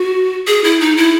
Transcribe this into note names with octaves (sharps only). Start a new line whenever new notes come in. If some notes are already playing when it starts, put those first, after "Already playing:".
Already playing: F#4
G#4
E4
D#4
E4